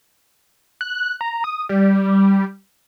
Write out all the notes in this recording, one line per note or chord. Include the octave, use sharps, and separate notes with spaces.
F#6
A#5
D#6
G3